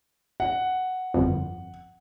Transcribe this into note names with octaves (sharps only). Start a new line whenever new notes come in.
F#5
G1 F2